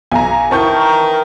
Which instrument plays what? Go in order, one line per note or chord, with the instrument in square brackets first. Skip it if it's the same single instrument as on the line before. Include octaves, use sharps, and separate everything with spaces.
[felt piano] B1 [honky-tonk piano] G#5 A#5
[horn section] D#3 E3 A#4 [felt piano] C4 E4 [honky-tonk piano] A5 C#6 G6